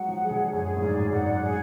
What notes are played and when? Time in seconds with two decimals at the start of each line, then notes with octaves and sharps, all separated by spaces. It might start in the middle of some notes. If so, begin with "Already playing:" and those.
Already playing: F#3 G#3 F#5
0.09 F3
0.23 G#4
0.31 D3
0.53 F#2 G#4
0.76 A2
0.82 G#2 D5
1.08 F#2
1.13 G#2 F#5
1.43 G#4